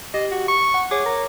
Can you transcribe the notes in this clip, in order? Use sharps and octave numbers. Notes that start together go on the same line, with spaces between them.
G4 D#5
F#4
C#6
F#5
G#4 C#5 D6
A#4